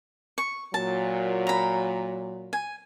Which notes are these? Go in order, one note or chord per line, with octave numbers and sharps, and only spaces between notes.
C#6
A#2 F#3 A5
A#5 B5
G#5